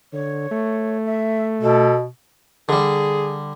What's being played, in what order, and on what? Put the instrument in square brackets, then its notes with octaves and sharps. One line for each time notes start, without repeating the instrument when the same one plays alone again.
[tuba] D3 [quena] C#5
[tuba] A3
[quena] E5
[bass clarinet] B2 [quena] A4
[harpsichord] D3 G3 [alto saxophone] G#4